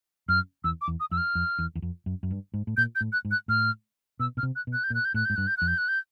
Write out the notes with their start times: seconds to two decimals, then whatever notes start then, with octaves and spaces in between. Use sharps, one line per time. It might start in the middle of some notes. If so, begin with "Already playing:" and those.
0.28 F#2 F6
0.64 E2 E6
0.81 D6
0.88 E2
1.00 D#6
1.11 F2 E6
1.17 F6
1.35 F2
1.59 E2
1.75 E2
1.82 F2
2.06 F#2
2.23 F#2
2.31 G2
2.54 G#2
2.67 A2
2.77 A#2 G6
2.95 G6
3.01 A2
3.12 F#6
3.25 G#2
3.31 F#6
3.48 A2 F6
4.20 B2 E6
4.37 B2 F6
4.43 C3
4.56 F#6
4.67 B2
4.73 F#6
4.84 G6
4.90 A#2
4.95 F#6
5.05 G6
5.14 A2 F#6
5.25 G#2 G6
5.36 G2 F#6
5.47 G6
5.57 F2 F#6
5.67 G6
5.78 F#6
5.88 G6